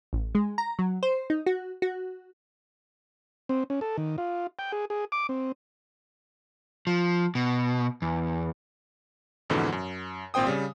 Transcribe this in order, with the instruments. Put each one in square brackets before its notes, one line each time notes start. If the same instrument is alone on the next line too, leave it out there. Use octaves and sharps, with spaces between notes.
[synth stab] A1
G#3
A#5
F#3
C5
D#4
F#4
F#4
[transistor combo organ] C4
C#4
A4
D#3
F4
G5
G#4
G#4
D6
C4
[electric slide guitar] F3
B2
E2
[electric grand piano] F2 G#2 B2 D3 E3
F#2
G#1 A#2 C4 C5 G5 D#6
C#3 G3